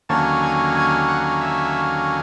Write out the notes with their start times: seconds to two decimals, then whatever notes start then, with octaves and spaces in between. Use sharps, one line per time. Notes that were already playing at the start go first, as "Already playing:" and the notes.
0.09 D#2 D3 F#3 A#3 C#4 A5
0.43 G#5
0.76 G#5
1.08 F#5
1.41 E5